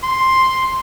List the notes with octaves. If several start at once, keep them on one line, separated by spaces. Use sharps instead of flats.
C6